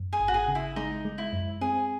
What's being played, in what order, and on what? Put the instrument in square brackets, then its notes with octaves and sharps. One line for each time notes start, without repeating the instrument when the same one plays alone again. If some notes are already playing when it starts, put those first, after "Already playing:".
Already playing: [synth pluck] F#2
[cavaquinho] G#4
[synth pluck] G#1
[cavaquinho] F#4
G#4
[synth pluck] C#3
[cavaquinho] E4
[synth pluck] G#3 [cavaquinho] D#4
[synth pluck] G#3
[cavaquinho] E4
[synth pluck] F#2
[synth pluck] C4 [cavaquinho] G#4